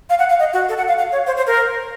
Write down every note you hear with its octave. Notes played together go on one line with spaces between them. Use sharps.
F5
F#5
F5
D#5
F#4
A4
F#5
F5
F5
C#5
C5
C5
A#4